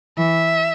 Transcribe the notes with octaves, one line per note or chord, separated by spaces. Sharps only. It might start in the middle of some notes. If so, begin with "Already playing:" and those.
E3 E5